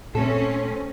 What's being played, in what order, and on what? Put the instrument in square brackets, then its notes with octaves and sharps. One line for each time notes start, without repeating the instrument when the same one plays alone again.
[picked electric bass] A#2 A3 [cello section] C4 C#4 [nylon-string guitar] A4